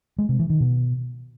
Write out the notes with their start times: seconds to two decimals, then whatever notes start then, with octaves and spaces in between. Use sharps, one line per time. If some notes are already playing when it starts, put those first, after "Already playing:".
0.18 G#3
0.29 C3
0.39 E3
0.50 D#3
0.60 B2